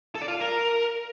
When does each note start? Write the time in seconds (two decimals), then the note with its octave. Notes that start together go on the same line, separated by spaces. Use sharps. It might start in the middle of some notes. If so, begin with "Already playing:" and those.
0.15 A4
0.22 D5
0.28 F4
0.34 F5
0.41 A#4